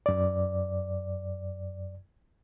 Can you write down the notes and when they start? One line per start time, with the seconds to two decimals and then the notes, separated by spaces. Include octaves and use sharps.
0.06 F#2 D5